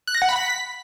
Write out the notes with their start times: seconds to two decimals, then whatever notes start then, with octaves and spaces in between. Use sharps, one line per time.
0.07 F#6
0.15 A#6
0.22 F#5
0.29 B5
0.36 B6